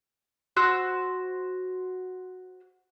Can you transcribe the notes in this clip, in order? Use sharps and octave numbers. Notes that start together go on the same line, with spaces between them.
F#4 C5 E6